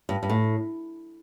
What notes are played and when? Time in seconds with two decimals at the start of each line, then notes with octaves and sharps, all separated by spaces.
0.09 G2
0.23 G2
0.30 A2